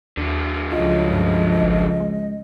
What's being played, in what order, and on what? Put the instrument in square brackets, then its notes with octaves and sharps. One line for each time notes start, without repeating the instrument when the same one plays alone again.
[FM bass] D#2 [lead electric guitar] D3 F#3
[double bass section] C#2 C#3 F3 [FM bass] F4 [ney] D#5
[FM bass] G2
G#1
G#3